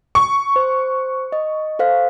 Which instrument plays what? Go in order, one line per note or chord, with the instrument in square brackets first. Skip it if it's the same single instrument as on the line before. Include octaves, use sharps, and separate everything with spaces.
[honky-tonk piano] C#6
[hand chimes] C5
D#5
A4 C5 F5